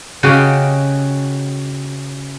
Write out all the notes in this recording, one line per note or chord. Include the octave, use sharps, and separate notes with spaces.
C#3 F#4 G4 D#5 F5